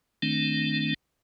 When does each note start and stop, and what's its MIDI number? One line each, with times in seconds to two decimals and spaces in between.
0.22 0.94 51
0.22 0.94 57
0.22 0.94 60
0.22 0.94 62